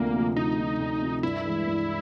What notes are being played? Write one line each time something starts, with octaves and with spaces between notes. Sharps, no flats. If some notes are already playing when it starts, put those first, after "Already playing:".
Already playing: D2 C3 F3 A#3
C3 F3
D2 D#4
C3 F3
D2
C3 F3
G2 E4
E3 G#3
G2